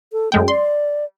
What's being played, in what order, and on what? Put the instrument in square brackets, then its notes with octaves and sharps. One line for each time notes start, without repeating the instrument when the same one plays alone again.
[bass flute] A4
[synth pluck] F#2 G#3 G5 [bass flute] A3
[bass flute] D5 [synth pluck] C6